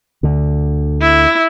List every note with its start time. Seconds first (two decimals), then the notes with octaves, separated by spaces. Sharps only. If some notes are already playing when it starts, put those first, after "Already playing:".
0.23 D2 D3
1.01 E4